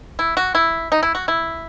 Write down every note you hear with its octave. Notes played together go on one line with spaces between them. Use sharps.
E4
F#4
E4
D#4
E4
F#4
E4